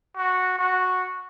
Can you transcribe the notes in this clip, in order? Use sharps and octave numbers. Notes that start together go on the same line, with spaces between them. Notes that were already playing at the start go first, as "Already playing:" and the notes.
F#4
F#4